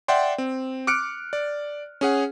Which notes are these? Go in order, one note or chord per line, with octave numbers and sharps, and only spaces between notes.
D5 E5 F#5 G5 C6
C4
D6 F6 F#6 C#7 D7
D5
C#4 G#4 F#5